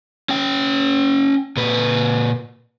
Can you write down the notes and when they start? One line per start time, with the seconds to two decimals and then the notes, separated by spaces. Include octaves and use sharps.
0.29 C#4 G5
1.57 A#2 B4